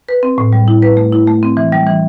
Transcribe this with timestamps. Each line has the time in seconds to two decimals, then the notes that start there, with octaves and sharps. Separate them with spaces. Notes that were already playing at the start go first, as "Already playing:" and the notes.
0.09 B4
0.23 C4
0.38 A2
0.53 G3
0.68 E4
0.82 B4
0.97 A3
1.13 E4
1.27 A3
1.43 C4
1.57 E3
1.72 G3
1.87 E3